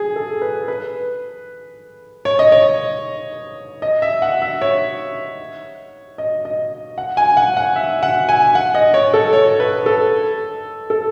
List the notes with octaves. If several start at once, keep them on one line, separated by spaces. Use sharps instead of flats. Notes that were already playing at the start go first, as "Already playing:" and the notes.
Already playing: G#4
A4
B4
B4
C#5
D#5
C#5
D#5
E5
F#5
E5
C#5
D#5
D#5
F#5
G#5
F#5
F#5
E5
F#5
G#5
F#5
D#5
C#5
A4
C#5
B4
A4
A4